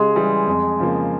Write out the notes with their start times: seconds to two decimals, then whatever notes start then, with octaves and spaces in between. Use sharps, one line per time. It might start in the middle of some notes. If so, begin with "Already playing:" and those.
Already playing: C#3 G#3
0.15 E3 G3
0.47 F2
0.79 C#3 F3 A#3